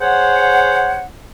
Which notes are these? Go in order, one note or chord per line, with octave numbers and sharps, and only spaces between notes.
G#4 C5 C#5 F#5